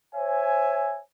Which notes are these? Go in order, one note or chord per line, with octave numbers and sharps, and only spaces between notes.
C5 C#5 E5 G#5